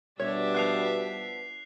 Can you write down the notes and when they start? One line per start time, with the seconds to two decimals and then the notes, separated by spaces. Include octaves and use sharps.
0.20 B2 G3 D4 C#5 E5
0.54 F3 B3 F#6 C7 F7